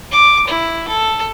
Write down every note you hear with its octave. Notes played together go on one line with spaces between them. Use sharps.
D6
E4
A4